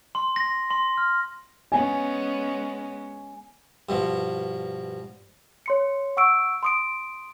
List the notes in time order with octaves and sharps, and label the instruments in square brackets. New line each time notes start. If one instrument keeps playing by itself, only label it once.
[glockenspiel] C6
A#6
C6
F6
[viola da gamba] G#3 B3 C#4 [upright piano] G#5
[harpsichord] G2 B2 F3
[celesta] C#5 C6 C#7
F#5 C#6 E6 D7
C6 D#6 D7